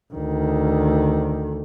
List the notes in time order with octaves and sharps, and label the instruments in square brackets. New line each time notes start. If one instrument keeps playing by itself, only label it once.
[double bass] D2 D#3